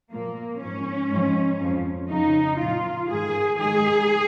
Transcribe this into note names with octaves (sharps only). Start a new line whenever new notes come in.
A#2 F3 A#3
G#2 F3 C#4
G#2 F3
F2 F3
F2 C#3 F3 D#4
A#2 F3 F4
G#2 D#3 G#4
G#2 D#3 G#4